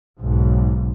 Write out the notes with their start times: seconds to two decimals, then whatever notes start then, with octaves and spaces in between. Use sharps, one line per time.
0.20 B1 G#2